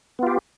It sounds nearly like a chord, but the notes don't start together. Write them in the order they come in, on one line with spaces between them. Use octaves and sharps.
B3 F4 G4